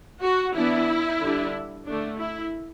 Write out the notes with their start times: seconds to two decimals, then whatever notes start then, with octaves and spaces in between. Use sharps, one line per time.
0.22 F#4
0.56 E3 B3 D4 E4
1.21 D3 G3 D4
1.87 D3 A3 D4
2.20 E4